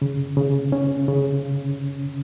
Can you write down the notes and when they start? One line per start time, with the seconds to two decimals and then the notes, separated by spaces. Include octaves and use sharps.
0.02 C#3
0.37 C#3
0.72 C#4
1.08 C#3